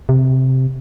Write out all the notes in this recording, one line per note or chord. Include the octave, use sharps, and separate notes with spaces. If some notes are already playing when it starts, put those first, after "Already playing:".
C3